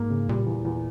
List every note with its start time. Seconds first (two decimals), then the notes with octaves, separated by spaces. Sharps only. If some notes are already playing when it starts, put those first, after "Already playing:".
Already playing: G#2 A#3
0.10 C#3
0.29 A#2 G3
0.47 E2
0.65 E2